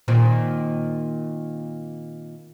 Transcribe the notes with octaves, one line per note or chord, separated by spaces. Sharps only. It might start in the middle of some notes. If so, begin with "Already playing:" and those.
A#2 D#3 C4